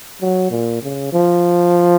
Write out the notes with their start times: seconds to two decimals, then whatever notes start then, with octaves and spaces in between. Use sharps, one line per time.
0.21 F#3
0.50 A#2
0.82 C#3
1.12 F3